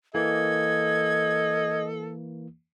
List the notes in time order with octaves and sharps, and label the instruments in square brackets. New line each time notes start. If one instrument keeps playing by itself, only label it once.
[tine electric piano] E3 A#3 [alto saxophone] A4 [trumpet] D#5 [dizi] G#6